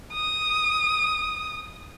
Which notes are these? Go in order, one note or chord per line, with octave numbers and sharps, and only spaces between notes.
D#6